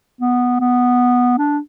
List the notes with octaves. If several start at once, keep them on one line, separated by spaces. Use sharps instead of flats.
B3
B3
D4